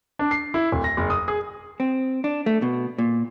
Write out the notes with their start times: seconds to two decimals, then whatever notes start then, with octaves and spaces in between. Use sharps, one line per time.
0.19 D4
0.31 C7
0.54 E4
0.72 D1
0.84 A#6
0.97 F#1
1.10 D#6
1.28 G#4
1.80 C4
2.24 D4
2.46 A3
2.62 B2
2.98 A#2